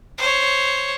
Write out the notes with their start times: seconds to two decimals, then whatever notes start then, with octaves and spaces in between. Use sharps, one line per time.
0.18 C5 C#5